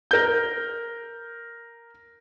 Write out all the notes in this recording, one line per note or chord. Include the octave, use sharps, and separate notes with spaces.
A#4 G6